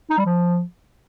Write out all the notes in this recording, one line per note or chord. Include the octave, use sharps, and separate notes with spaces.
D#4
G3
F3